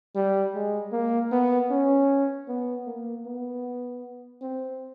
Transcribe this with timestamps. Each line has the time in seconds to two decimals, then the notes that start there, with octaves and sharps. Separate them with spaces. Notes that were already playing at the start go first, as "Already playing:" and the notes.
0.15 G3
0.55 G#3
0.92 A#3
1.32 B3
1.70 C#4
2.48 B3
2.87 A#3
3.26 B3
4.42 C4